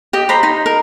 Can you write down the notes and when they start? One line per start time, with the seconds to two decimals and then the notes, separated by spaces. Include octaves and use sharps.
0.13 G4 D#5
0.29 C5 A#5 B5
0.43 D#4
0.66 A#4